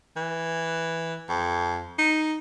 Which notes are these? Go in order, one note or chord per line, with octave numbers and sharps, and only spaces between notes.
E3
F2
D#4